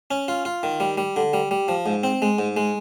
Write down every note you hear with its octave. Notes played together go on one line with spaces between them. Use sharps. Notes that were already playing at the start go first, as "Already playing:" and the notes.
C#4
F4
F4
D#3
G3
G3
D3
G3
G3
F3
G#2
C4
G#3
G#2
G#3